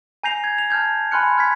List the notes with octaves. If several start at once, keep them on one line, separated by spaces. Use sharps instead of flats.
G#5 A#5 G6 A#6 C7 F7
G#6
F7
A5 F6 G6 G#6
G#5 B5 C6 F6 F#6 C#7
F6 G#6 B6